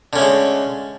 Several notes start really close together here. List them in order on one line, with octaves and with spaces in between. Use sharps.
D3 C#4 A3 G#3